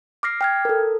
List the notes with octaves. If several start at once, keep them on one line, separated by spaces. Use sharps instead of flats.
D6 F6 A#6 C7
G5 F6 G#6
A4 A#4